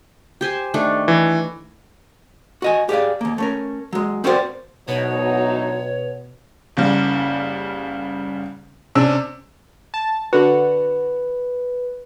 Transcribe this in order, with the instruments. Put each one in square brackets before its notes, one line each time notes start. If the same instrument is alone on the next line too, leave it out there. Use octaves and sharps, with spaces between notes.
[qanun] G4 C5 G#5
D#3 A3 D4
[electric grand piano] E3
[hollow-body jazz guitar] F#4 D#5 G#5
G4 G#4 D5 F5
D#2 A#3
A3 C#4 A#4
F#3 G#3
C4 F#4 G4 A#4 C5 D5
[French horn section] D2 F#3 D#4 [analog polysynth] B2 [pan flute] C#5
[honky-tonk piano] F#1 C#3 G3
C3 C#4 D4 E6
[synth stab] A5
[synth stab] D3 F#4 [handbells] B4